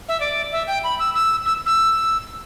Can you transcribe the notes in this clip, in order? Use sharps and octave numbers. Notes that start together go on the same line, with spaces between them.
E5
D5
E5
G5
B5
E6
E6
E6
E6